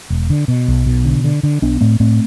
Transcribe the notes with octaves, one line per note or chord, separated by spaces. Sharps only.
E1
D3
B2
B1
B2
D3
D3
D3
B1 B3 D4
A2 A3 C4
A2 A3 C4